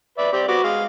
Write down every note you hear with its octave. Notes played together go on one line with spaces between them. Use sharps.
B4 D5 E5
C4 G4 D5
B3 F#4 D6
G#3 F5